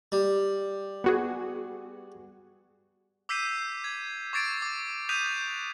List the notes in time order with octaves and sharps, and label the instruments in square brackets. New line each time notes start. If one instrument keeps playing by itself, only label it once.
[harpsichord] G3
[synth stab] B3 F#4 G#4
[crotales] D6 E6 G6 B6 C7 D#7
G#6
C#6 D6 G#6 A6 C7 D7
D6
D#6 F#6 G6 B6 D#7 F7